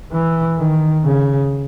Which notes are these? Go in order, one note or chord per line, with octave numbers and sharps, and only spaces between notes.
E3
D#3
C#3